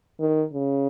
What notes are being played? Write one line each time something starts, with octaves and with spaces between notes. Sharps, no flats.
D#3
C#3